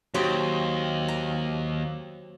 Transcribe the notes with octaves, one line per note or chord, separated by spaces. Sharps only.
D#2 F#3 C4 G4
A#5